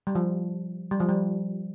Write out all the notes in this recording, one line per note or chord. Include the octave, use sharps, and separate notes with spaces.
G3
F3
G3
F3
G3